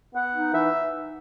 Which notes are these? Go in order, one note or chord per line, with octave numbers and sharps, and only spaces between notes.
B3 F#5
D#4
E3 E5